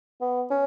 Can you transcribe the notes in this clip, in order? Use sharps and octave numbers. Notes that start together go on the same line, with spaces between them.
B3
C#4